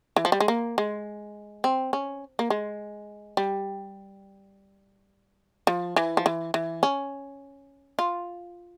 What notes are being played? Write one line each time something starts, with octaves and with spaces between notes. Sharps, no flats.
E3
F3
G3
G#3
A#3
G#3
C4
C#4
A#3
G#3
G3
F3
E3
F3
E3
E3
C#4
F4